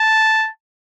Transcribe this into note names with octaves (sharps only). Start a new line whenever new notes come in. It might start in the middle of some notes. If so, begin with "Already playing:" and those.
Already playing: A5